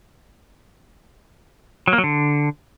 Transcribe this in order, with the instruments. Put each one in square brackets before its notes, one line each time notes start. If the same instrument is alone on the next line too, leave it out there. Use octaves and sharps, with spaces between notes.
[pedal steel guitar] F#3
A#3
F#3
D3